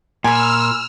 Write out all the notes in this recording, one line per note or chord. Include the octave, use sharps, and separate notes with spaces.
A#2 G#5 B5 E6 F6